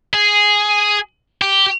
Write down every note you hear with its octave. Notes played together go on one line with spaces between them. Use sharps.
G#4
G4